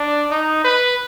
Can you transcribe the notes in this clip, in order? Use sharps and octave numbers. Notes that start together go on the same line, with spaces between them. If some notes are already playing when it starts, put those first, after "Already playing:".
Already playing: D4
D#4
B4